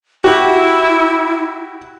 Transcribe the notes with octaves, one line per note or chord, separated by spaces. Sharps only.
E4 F#4 G4